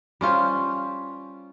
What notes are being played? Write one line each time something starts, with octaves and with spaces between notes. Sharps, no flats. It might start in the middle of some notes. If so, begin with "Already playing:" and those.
G3 C#4 F4 C5